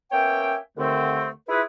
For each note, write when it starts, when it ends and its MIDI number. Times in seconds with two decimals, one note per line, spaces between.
0.11 0.55 58
0.11 0.55 59
0.11 0.55 61
0.11 0.55 73
0.11 0.55 76
0.11 0.55 79
0.77 1.29 39
0.77 1.29 50
0.77 1.29 57
0.77 1.29 60
1.48 1.61 64
1.48 1.61 65
1.48 1.61 68
1.48 1.61 71